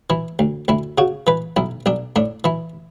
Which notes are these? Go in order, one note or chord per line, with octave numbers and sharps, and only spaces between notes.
E3 E4
D2
D2 E4
C#3 F#4
E3 B4
B1 E4
B1 D4
A2 D4
E3 E4